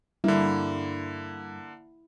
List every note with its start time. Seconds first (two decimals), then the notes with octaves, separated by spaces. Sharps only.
0.24 G2 D3 A#3 E4